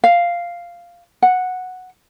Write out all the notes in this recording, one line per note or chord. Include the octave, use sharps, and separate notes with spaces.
F5
F#5